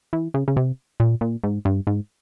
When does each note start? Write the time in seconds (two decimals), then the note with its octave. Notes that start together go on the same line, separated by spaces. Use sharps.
0.13 E3
0.34 C#3
0.48 C#3
0.57 C3
1.00 A#2
1.21 A#2
1.44 G#2
1.65 G2
1.87 G#2